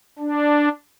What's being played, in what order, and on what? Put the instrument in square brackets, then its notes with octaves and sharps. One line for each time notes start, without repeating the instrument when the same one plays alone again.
[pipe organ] D4